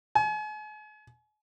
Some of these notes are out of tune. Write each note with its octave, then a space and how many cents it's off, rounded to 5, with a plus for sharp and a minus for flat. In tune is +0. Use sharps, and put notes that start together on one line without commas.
G#5 +40